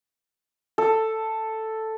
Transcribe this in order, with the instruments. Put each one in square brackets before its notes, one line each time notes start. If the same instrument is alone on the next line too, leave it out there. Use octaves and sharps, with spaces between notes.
[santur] A4